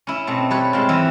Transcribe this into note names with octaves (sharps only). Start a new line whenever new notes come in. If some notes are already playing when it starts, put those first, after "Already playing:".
C#4 E4
B2 A3 C4
G3 B4 C#5
G#3 C4 F4
E3 F#3 E4